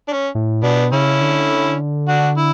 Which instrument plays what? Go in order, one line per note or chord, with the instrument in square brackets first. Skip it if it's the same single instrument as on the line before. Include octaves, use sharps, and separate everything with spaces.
[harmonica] D4
C#4
[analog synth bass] A2
[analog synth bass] B2 [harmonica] B3 D4
[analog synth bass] C#3 [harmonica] C#4 E4
[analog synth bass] D3
[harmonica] D4 F#4
E4